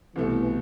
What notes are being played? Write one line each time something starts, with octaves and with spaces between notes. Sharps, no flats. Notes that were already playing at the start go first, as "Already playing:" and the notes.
C2 B2 E3 A3